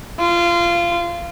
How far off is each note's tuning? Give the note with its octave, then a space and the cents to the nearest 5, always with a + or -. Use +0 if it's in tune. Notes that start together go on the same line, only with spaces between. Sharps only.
F4 -20